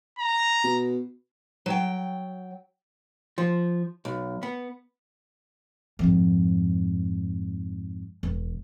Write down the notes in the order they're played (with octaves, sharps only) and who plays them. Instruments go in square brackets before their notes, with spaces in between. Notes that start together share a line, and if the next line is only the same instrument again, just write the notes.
[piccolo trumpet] A#5
[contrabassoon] B2
[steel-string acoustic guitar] F#3 G5
[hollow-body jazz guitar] F3
B1
B3
[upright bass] F2 G#2
E1